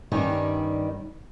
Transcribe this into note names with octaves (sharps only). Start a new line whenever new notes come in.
G2 D#3 G3 C#4 D#4